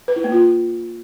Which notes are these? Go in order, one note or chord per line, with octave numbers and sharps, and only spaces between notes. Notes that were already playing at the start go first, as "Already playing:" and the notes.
B4
E4
A#3
F4